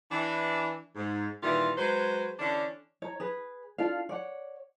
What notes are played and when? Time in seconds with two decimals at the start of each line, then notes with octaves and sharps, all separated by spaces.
0.11 E3 D4
0.96 G#2
1.43 A#2 D#3 E3 G3 F4 G4
1.77 F#3 G#3 B4 C5
2.39 D3 E3 C#4 D4
3.02 C#5 A#5
3.20 G#4 B4
3.78 D4 F4 A4 F5
4.09 C#5 D5 F#5